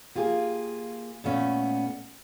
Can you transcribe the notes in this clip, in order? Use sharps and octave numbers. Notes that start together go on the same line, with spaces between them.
A#3 F4 G4 G#4
A#2 A3 B3 C#4